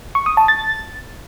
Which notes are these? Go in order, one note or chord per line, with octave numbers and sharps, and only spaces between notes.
C#6
D#6
A5
A6